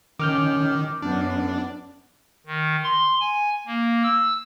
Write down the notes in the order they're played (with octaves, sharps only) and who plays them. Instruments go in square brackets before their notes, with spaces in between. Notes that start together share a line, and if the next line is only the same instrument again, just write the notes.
[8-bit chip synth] D#3 [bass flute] C#4 [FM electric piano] D6 F6 G6
[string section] F#2 [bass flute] B3 [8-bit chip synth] D4
[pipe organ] D#3
C6
G#5
A#3
E6